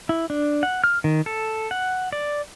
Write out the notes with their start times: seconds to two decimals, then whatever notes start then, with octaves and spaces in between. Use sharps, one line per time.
0.09 E4
0.30 D4
0.63 F#5
0.84 F6
1.04 D#3
1.26 A4
1.71 F#5
2.13 D5